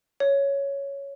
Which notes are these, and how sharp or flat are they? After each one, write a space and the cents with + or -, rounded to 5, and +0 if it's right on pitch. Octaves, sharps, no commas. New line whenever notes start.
C#5 +5